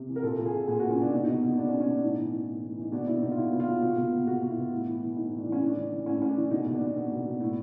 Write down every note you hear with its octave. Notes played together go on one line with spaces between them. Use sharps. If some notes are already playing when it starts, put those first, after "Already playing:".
Already playing: C3
E3
A#4
A#2 A4
A#2
G#4
A#2
A#2 G#4
A#2 F#4
C#4
A#2 D4
B2 D#4
B2 D#4
B2 D#4
B2 D4
C#4
B2
C#4
B2 D4
A2 D#4
E3
E3
A2
A2
E3 D#4
B2 D4
B2 E4
B2 D#4
F4
B2 E4
B2
F4
B2
B2
B2
B2
B2 F#4
B2
E4
B2
A2
E3
E3
A2 D#4
A2
D4
E3
C#4
A2 D4
E3
E3
A2 C#4
A2 C#4
D4
E3
B2 D#4
B2
D4
B2
B2
B2
B2
A2